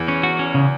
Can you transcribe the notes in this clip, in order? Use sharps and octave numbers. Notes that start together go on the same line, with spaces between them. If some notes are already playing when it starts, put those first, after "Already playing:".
Already playing: E2 E3
C#4
F#4
C#4
C#3